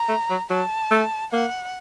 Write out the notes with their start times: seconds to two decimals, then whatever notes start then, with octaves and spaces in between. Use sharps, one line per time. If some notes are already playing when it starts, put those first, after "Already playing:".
Already playing: A#5
0.09 A3
0.30 F#3
0.50 F#3 A5
0.91 A3
1.32 A#3 F#5